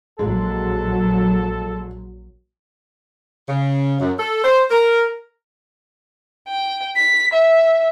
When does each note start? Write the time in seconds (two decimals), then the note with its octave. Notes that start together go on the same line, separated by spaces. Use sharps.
0.19 A#1 F#3 G#3 A4
3.49 C#3
4.00 F#2
4.19 A4
4.43 C5
4.70 A#4
6.49 G5
6.96 B6
7.33 E5